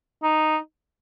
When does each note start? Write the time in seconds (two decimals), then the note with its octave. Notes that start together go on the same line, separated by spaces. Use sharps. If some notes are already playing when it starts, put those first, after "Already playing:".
0.23 D#4